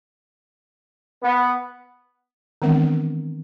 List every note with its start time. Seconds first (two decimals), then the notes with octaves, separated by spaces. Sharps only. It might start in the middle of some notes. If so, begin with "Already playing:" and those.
1.23 B3
2.62 D#3 E3 G#3 B3 C4 D4